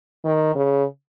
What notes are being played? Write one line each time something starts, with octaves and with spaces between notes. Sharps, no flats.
D#3
C#3